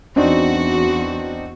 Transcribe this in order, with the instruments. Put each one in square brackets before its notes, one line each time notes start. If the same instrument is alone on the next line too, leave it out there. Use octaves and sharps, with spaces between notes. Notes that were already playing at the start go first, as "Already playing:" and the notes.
[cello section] E2 F#4 [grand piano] C4 D4 D#4